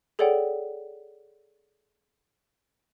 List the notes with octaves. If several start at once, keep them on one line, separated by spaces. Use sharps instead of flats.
G#4 A4 C#5 D5 F#5 G5